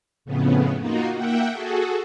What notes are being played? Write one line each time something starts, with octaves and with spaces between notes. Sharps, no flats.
F2 A2 C#3 B3
A#3 D#4 F4 F#4
A#3 E5 F#5 G5
F#4 G#4 A4